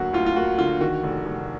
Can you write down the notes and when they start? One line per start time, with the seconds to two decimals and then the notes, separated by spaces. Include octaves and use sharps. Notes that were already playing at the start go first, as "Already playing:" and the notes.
Already playing: D2 D3 F#3 A#3 F#4
0.13 D2 F4
0.26 F4
0.36 A#3 F#4
0.58 D3 F4
0.81 D#3 F#4
1.03 F1
1.26 F1